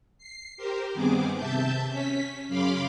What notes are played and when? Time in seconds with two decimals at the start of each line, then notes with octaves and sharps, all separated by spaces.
0.18 C7
0.57 G4 A#4 C5
0.94 G2 D#3 B3 C4 G#4 D6
1.36 C3 E5 A5 G6
1.88 C#4 B6
2.48 F#2 C#3 F5 B5 C6 D6